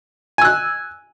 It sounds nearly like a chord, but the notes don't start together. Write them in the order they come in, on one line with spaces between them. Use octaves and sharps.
G#5 E6 F#6